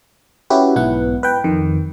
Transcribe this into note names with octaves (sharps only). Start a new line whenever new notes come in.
C#4 E4 F#4 G4 B4
B1 G#2 B3 E4 F#5
B4 G5
F2 D#3